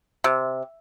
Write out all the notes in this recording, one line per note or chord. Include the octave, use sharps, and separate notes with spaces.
C3